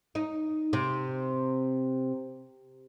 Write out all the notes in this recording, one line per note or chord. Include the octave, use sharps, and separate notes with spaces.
D#4
C3